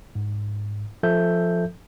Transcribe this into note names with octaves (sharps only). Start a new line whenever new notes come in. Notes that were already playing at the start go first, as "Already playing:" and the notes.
G#2
F3 A4 E5 G6